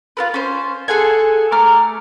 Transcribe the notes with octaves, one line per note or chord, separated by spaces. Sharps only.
F4 A#4 B4
C#4 C5
G#4 A4 F#5 G#5
A3 A#5 D6 F6